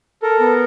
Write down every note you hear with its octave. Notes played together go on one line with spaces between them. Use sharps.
A4 A#4
B3